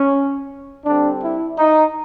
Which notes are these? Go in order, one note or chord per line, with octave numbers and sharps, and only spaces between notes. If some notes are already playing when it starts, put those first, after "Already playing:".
Already playing: C#4
D3 G3 C4 D4
E4
D#4